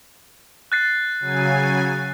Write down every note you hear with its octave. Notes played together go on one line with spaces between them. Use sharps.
F#6 A6 C7
C#3 F#3 G#5